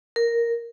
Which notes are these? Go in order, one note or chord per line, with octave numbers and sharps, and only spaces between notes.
A#4